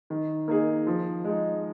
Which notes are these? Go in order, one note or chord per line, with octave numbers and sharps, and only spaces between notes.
D#3
A#3 D#4 G#4
F3
G#3 D#4